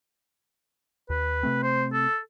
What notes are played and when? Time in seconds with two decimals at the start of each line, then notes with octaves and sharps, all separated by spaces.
1.10 D#2 B4
1.43 C3 A3 C4
1.63 C5
1.93 A4